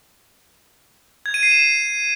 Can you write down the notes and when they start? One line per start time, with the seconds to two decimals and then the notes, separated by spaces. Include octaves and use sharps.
1.26 G#6
1.34 D#7
1.43 C7
1.51 E7